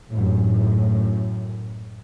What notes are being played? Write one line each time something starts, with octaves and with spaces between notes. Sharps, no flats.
F#2 A2